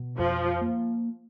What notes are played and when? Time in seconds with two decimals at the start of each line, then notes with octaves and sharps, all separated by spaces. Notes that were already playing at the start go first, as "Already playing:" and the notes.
Already playing: B2
0.19 F2 F3
0.61 A#3